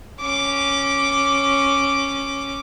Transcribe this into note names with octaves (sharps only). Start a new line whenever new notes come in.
C#4 D6